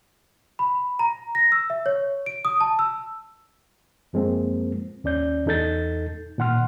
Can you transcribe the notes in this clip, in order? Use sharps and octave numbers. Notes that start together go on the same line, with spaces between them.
B5
A#5
A#6
E6
E5
C#5
D7
D#6
A5
E6
F#2 F3 G#3 A#3 C4
D#2 C#4 D5 G6
E2 D#4 A4 G6 A6
A#2 D#3 F#5 C6 F6